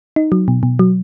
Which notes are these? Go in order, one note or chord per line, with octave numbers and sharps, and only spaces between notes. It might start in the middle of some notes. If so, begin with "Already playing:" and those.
D#4
F#3
B2
B2
F#3